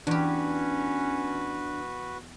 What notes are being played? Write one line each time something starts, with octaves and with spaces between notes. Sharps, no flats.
E2 C#4 D4 F#4 G4 B4